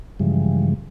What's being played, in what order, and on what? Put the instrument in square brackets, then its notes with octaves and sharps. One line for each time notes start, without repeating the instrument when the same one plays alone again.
[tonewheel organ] G2 C#3 E3 F3 G3 G#3